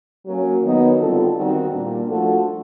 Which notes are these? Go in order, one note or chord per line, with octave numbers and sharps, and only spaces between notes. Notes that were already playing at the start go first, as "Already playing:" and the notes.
F#3 A#3 C#4
D#3 F#3 B3 D#4
D3 G3 C4 F4 A4
D#3 G3 C4 D#4 F#4
A#2 G3 A#3 D4
F3 A3 D4 F#4 A4